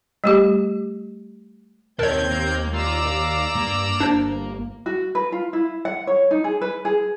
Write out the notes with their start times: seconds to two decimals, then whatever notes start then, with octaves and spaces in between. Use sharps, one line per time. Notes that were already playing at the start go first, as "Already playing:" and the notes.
0.24 G3 A3 G4
1.99 D#2 D#3 C4 A4 A#4 C#5 G6 G#6
2.30 A#3
2.74 F4 D5 F5 A#5 E6
3.07 F5
3.56 G2 A#3
4.00 G1 D4 C5
4.86 F#4
5.15 B4
5.32 F4
5.53 E4
5.85 F#5
6.07 C#5
6.31 D#4
6.44 G#4
6.61 B4
6.85 G#4